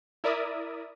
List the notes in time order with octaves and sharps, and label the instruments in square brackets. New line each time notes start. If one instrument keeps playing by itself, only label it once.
[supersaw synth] E4 A#4 D5 E5 D#6